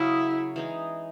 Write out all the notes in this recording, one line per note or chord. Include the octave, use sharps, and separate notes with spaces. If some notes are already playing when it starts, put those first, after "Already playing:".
Already playing: C#3 F#3 C#4 E4 G#4
E3 G#3 D#4